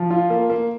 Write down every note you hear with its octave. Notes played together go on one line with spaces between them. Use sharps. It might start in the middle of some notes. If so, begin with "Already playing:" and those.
Already playing: F3
F4
A#3
A#3